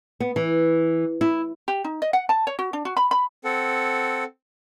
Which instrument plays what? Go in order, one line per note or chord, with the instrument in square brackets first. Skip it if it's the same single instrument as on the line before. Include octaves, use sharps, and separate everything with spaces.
[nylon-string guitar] B3
E3
E4
[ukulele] G4
D#4
D#5
F#5
A5
C#5
F#4
D4
F#4
B5
B5
[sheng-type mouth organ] C4 A4 F#5